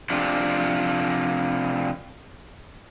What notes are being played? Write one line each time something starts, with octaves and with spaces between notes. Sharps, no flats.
C3 F3 D4